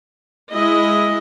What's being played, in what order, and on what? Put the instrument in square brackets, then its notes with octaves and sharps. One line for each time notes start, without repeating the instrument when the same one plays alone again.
[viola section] G#3 E4 D#5